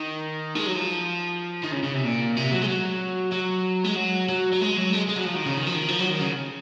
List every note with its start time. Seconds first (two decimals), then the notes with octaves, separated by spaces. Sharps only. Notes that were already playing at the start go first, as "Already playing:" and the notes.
Already playing: D#3
0.55 G#3
0.66 F#3
0.76 F3
1.64 D#3
1.72 C#3
1.83 C#3
1.94 C3
2.04 A#2
2.37 C3
2.52 F#3
2.62 G#3
2.68 F#3
3.32 F#3
3.84 G#3
3.96 F#3
4.29 F#3
4.52 F#3
4.61 G#3
4.77 F#3
4.93 G#3
5.08 G#3
5.16 F#3
5.24 F3
5.35 D#3
5.46 C#3
5.57 D#3
5.67 F3
5.76 D#3
5.88 F3
5.99 F#3
6.10 D#3
6.21 C#3